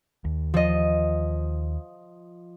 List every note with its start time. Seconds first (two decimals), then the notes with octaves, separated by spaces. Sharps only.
0.25 D#2
0.54 F3 D#5